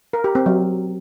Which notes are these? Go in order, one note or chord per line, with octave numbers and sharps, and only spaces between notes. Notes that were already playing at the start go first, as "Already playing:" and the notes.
A#4
G4
C4
F#3